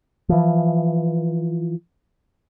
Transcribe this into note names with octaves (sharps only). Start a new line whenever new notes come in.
E3 F3